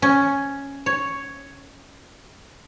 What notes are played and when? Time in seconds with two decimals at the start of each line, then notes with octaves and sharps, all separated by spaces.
0.02 C#4
0.86 C#5